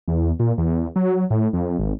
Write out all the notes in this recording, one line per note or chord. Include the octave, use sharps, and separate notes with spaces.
E2
A#2
E2
F#3
A2
F2
G#1